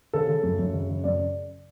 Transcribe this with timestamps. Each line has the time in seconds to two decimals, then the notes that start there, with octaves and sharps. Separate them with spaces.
0.13 C#3 A4
0.29 C#3
0.43 F#2
0.59 F#2
0.74 C#3
0.90 C#3
1.04 F#2 D5